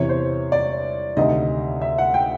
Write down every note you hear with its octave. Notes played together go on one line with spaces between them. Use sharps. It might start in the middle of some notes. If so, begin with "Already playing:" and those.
Already playing: E2 C3 E3 C#5
C5
D5
D2 C3 D#3 D#5
E5
F#5
G5